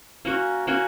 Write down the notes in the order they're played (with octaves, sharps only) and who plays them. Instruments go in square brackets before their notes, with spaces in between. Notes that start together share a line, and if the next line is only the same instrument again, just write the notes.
[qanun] A#3 C#4 F#4
A#3 C#4 F#4